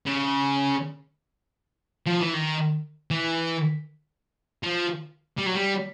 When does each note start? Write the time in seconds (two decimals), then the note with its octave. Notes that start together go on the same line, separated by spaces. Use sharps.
0.06 C#3
2.07 F3
2.21 E3
2.34 D#3
3.11 E3
4.63 F3
5.39 G3
5.47 F#3
5.55 G3